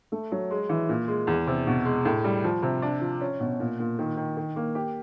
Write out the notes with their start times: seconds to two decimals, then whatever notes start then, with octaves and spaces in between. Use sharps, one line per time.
0.12 A3
0.32 F#3
0.51 G#3
0.69 E3
0.89 A#2
1.08 G#3
1.27 E2
1.47 C3
1.67 B2
1.85 G#3
2.05 A2
2.24 G3
2.44 F3
2.62 C3
2.82 D4
3.01 F3
3.21 C#4
3.40 B2
3.60 A#2
3.79 A#2
3.99 D#3
4.17 D#3
4.37 D#3
4.56 A#3
4.75 G4